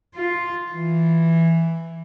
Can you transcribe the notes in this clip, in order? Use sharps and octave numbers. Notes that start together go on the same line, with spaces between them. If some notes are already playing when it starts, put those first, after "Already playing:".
F4
E3